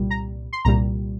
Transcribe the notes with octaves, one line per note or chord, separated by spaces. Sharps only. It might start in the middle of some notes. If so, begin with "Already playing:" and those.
Already playing: C2 A#2 G3
A#5
C6
C2 A#2 G3 A#5